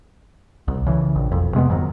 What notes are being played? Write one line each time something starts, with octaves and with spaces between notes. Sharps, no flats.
C2
C#3 E3
A#1
E1 F2
C3 G#3 A#3 B3
F2 G#2 D#3 F#3